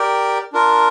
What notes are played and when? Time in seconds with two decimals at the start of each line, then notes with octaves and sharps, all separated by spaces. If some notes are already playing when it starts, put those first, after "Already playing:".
Already playing: G4 A#4 D5 G5
0.52 D4 F4 A#4